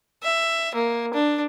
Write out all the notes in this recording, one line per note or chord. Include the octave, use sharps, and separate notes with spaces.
E5
A#3
D4